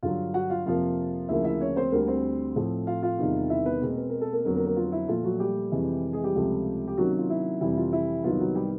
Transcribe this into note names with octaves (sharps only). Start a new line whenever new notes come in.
G2 D3 F#3 F4 F5
F#4 F#5
F4 F5
F2 C3 F3 A#3 F4 F5
D2 C#3 F3 A#3 E4 E5
E4 E5
C#4 C#5
C4 C5
D2 D3 G3 A#3 A#4
C4 C5
A2 F3 A3 C4
F4 F5
F4 F5
E2 C3 D#3 G3
E4 E5
B3 B4
B2 G#3 A#3 C4 A#4
B4
A#4
A4
A#3 A#4
F2 D3 F#3 A#3 B3 A#4
A#3 A#4
A#3 A#4
F4
E4
A#2 F3 A3 F4
F#3 F#4
G3 G4
F2 C3 E3 G#3
G#3 G#4
G3 G4
C#2 C3 F3 A3
G4
C3 D#3 F#3 A#3 C#4 F#4
F4
E4
F2 C3 E3 G3 E4
F4
E4
C2 C3 D#3 F#3 B3 F4
F#3 F#4
G3 G4